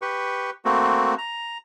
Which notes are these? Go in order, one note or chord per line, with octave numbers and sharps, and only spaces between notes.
G4 B4 C#6
A3 A#3 C4 F#4
A#5